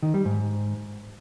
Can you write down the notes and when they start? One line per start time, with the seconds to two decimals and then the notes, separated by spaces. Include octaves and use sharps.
0.03 D#3
0.14 G3
0.25 G#2